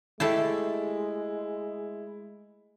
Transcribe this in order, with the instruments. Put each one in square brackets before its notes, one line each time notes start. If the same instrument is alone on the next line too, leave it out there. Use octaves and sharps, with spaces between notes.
[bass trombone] G#3 [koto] A3 G4 A5 [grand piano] E4